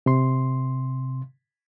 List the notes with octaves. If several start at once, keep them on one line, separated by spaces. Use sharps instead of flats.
C3 C6